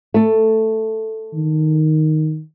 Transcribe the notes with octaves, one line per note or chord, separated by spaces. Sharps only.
A3 A4
D#3